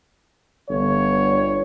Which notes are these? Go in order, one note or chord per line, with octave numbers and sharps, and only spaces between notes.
G1 C#5